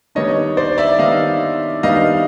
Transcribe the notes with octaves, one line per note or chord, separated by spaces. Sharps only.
D#3 G3 B3 D4 C#5 D#5
C5 D5
D5 E5
D#3 G3 B3 D4 D#5 F5
D#3 G3 B3 D4 D#5 F5